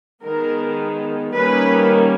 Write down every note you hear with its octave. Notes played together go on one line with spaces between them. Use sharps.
D#3 G#3 B3 A#4
D#3 G3 A#3 C#4 B4